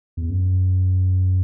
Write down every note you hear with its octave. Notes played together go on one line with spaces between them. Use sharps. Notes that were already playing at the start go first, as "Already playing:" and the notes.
E2
F#2